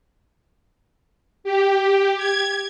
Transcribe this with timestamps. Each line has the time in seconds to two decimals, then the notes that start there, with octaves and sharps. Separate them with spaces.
1.44 G4
2.17 G#6